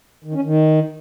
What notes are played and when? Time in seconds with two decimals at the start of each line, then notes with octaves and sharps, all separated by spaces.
0.24 D#3
0.34 C#4
0.44 D#3